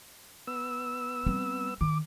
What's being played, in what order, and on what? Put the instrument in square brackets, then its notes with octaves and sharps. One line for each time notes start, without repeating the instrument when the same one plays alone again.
[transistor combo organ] B3 E6
[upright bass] G3 C4
[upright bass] D#3 [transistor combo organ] D6